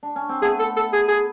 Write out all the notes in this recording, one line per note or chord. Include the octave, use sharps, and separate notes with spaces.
D4
C#4
C4
A3 B3 G#4
A4
A4
G#4
G#4